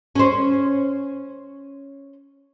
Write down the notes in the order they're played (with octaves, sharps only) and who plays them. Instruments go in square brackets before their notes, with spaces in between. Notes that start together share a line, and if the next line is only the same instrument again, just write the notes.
[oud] C#4 C5